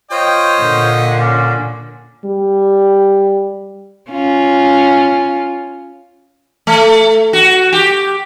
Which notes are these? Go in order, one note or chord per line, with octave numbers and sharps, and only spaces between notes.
F4 C5 C#5 D#5 G5
A#2 D3
C#4 D5
G3
C#4 F4
A3
F#4
G4